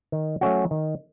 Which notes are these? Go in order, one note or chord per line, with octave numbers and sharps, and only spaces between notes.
D#3
F#3 A3 C#4 F#4
D#3